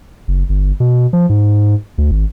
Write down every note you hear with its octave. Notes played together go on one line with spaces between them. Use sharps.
F#1
G1
B2
F3
G#2
D2
G#1